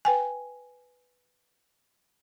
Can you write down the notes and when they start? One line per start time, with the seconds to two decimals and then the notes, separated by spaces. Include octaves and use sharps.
0.05 B4 G5 G#5